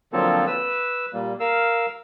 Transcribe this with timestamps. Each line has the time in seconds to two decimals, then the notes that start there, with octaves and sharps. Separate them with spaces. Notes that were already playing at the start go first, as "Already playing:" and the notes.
0.13 D3 F3 F#3 A#3 C4 A4
0.47 B4 E6
1.13 A#2 G3 A#3
1.40 A#4 F5 E6